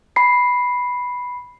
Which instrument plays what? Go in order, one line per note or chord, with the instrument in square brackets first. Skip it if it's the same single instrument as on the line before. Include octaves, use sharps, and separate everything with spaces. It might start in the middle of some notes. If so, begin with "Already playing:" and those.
[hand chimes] B5 C7